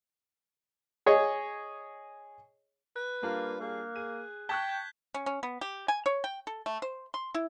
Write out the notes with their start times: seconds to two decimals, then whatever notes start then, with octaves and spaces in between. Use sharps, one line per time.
1.06 G#4 C#5 D#5
2.96 B4 F#6
3.23 G3 A#3 D4 F4
3.60 A#3 G#4
3.96 G#4 D#7
4.49 G5 A5 C#6 F#6 G#6 B6 G7
4.69 G6
5.14 C#4
5.26 C#4
5.43 B3
5.61 G4
5.88 G#5
6.06 C#5
6.24 G5
6.47 A4
6.66 A3
6.82 C5
7.14 C6
7.34 E4